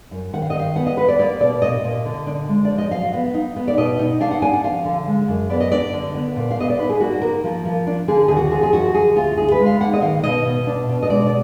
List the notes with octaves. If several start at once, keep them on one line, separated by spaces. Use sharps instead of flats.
F#2
D#3 F#5
F5
D#5
D#3
F5
B3 F#5
D#5
B3 B4
D5
A#3 D5
B2 D5
A#2 D#5
A#2
D3
D4
G#3
F3 D5
D#5
F#3 F5
B3
D#4
B3
D5
B2 D#5
D#4
D4 F5
F#5
D4 G#5
F#5
F3 F5
D3
G#3
F#2
B3 D5
D#5
D4 D5
D3
B3
A#2
F5
B3 D#5
D5
D#4 B4
G#4
A#3 F#4
F#4
A#3 A#4
F3
F3
D4
D3 G#4
D#2 G#4
F#4
F3 G#4
G#4
F#2 F#4
D3 G#4
D2 F4
D#4 G#4
B4
G#3
F5
A#3 F#5
D#5
D#3 F5
B2 D#5
B2
D4
B2
D#5
G#3 D5
D5